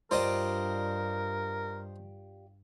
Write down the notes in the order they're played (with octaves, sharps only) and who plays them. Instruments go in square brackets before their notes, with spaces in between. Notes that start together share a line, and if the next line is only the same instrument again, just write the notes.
[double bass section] G2 [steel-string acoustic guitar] F4 G4 D5 [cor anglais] A#4 [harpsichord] C5 D#5 A5